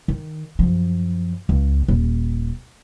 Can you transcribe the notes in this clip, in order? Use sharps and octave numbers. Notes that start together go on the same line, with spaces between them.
D#3
F#2 F3
C#2
D#1